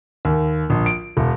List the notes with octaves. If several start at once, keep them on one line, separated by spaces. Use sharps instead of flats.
D#2
A#1
D7
E1